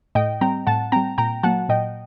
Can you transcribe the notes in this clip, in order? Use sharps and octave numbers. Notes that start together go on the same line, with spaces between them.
A2 D#5 G5
G3 C4 G5 A#5
A2 F#5 A5
G3 C4 G5 A#5
A#2 G5 A#5
F#3 A#3 F#5 A5
A#2 D#5 G5